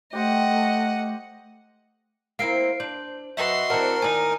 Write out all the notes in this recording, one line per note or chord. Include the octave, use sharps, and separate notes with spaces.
A3 G4 C5 D#5 F#5
A#3 C4 E4 F5 C7 D7
D4 C5
F#2 F#4 B4 D#5 E5 C6
E3 C4 A#4 D5 F#5 A5
D#2 D#4 D5 G#5